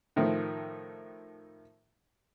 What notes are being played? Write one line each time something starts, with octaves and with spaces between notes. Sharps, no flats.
A2 D#3 F3 A3